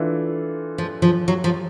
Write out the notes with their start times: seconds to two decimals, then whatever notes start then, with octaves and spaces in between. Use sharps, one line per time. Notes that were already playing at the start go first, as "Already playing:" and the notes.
Already playing: E3 A3 D4 F4 A4
0.78 F3
1.02 F3
1.28 F#3
1.44 F3